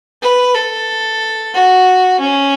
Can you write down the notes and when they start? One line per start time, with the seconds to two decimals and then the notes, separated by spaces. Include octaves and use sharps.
0.22 B4
0.56 A4
1.55 F#4
2.20 C#4